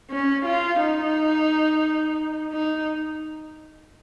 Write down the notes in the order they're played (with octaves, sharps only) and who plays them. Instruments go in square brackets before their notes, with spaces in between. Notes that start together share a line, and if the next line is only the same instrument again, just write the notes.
[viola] C#4
F4
D#4
D#4